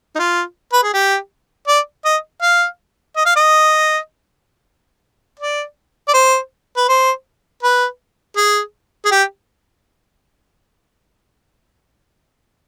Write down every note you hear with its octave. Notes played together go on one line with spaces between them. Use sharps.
D#4
F4
B4
G#4
G4
D5
D#5
F5
D#5
F5
D#5
D5
D5
C5
B4
C5
B4
G#4
G#4
G4